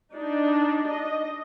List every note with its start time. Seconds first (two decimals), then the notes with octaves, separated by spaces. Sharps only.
0.12 D4 D#4
0.88 D#5